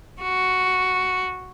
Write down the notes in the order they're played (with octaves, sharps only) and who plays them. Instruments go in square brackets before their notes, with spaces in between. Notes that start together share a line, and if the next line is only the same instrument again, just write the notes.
[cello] F#4